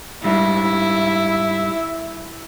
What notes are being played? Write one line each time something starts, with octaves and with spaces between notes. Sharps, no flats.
G#2 G3 E4 E5